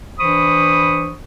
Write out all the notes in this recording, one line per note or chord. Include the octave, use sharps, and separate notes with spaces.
E3 D4 C5 B5 C#6 D#6